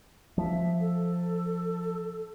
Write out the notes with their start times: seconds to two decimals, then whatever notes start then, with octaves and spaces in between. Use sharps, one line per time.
0.38 F3 E5
0.80 A4